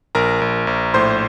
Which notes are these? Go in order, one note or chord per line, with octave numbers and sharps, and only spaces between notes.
A#1 A#4 A#5
A#1
A#1
A2 C5 C6